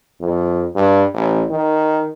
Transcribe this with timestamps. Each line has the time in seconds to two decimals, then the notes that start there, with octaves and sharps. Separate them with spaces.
0.21 F2
0.75 G2
1.14 A1
1.50 D#3